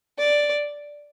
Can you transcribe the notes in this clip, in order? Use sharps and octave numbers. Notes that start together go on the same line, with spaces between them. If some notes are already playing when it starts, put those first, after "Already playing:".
D5